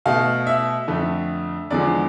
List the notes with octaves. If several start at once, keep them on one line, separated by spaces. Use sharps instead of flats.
B2 A3 F5
E5
F2 D3 A3
E2 D3 F3 G#3 D5